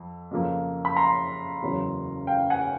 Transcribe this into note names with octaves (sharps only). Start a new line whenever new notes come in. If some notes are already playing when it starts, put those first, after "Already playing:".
Already playing: F2
F2 C#3 F3 A#3
B5
A#5 C6
F#1 E2 C#3 F#3
F5 G5
F#5 G#5